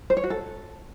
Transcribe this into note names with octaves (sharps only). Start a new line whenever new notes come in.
C5
C#5
F#4
A4